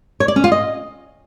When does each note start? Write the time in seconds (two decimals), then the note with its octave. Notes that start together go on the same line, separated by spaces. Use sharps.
0.20 C#5
0.28 D5
0.36 C#4
0.44 F4
0.52 D#5